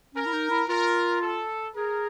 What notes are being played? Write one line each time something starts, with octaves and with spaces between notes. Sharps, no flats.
C#4 A#4
E4
D#4
E4
F4 A#4
A4
G#4 A#4